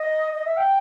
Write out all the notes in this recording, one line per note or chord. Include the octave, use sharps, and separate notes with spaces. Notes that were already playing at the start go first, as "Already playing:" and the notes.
Already playing: D#5
D#5
E5
G5